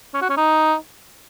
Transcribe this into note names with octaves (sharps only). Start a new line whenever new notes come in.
C#4
F#4
C#4
D#4